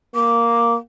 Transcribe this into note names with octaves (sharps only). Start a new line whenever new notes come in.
A#3 D6